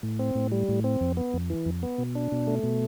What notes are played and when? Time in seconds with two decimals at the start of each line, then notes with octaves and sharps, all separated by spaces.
0.03 A2
0.19 C4
0.35 A2
0.52 G3
0.68 A2
0.84 C4
1.01 F2
1.17 B3
1.34 F2
1.50 E3
1.65 F2
1.83 B3
1.98 B2
2.15 D4
2.32 B2
2.47 A3
2.63 B2